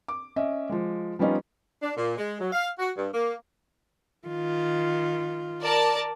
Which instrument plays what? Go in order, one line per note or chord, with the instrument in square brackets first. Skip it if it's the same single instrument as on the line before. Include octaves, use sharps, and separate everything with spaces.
[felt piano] D6
C#4 D#5 E5
F3 G#3
F3 G3 B3 C#4 D#4 F4
[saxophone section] D4
A#2
G#3
F#3
F5
F#4
G2
A#3
[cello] D#3 F4
[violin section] A#4 D5 A5